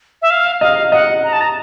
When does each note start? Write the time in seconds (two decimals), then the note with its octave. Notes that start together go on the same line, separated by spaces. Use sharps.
0.22 E5
0.31 F5
0.61 D#5 F5
0.92 D#5 F#5
1.24 A#5
1.33 A5
1.41 A#5